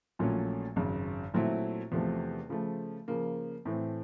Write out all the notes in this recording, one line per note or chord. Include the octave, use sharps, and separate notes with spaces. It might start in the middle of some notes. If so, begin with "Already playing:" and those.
A#1 A#2 F#3 A3 C#4
G#1 F#2 C#3
A#2 F#3 A3 C4 E4
E2 C3 F3 A3
C#3 F3 A3
C#3 F3 A#3
A2 E3 A3 C4